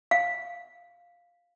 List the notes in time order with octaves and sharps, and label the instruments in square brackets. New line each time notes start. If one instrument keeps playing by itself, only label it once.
[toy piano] F5